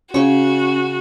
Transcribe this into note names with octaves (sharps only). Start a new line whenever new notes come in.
C#3 C#4 F#4 C#6